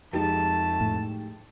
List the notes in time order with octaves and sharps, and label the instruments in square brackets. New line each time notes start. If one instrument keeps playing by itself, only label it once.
[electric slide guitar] F2 [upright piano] G#3 D#4 G4 [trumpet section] A3 A5
[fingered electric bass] A2